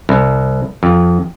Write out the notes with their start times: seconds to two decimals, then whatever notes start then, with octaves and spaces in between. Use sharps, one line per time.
0.09 C2
0.83 F2